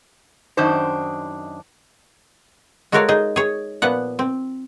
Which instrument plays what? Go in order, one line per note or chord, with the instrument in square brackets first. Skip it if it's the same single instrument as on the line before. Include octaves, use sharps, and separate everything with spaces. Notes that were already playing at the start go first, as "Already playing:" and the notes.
[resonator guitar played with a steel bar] F#2 D#3 D4 D#4 C5
[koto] G#3 F#4 A4 A#4 C#5 F5
D#4 G#4
G#4 C#5
A#2 F3 B3 F#5
C4